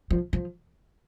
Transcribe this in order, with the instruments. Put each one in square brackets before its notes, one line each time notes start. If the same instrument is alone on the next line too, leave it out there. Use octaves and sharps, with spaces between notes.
[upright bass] F3
F3